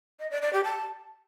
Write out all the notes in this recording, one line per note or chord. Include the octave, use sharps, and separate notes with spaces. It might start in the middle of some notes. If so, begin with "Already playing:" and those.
D#5
D5
D5
G4
A5